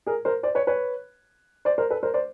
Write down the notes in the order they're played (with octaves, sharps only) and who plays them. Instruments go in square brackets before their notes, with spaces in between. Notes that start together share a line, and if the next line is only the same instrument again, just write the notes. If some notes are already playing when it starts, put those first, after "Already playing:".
[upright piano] G#4 A#4
A#4 C5
C5 D5
B4 C#5
B4 C#5
C5 D5
A#4 C5
A4 B4
A#4 C5
C5 D5